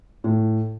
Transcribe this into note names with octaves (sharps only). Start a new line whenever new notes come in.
A2